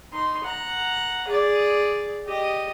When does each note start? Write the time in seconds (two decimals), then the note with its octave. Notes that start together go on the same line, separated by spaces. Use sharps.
0.13 D#4 C6
0.44 F#5 A#5
1.28 G#4 D5
2.26 G4 D#5